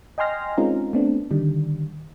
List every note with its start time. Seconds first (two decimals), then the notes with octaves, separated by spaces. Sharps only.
0.18 D#5 G5 G#5 C6 F6 A#6
0.58 G#3 C4 C#4 D#4 F4 A#4
0.93 A3 B3 C4 D4
1.31 D3 D#3 G3